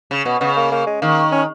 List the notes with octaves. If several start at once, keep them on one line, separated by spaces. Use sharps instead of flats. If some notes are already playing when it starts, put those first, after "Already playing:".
C#3
B2 B3
C#3 B3
A#3
A#3
G#3
D#3 A#3
C#4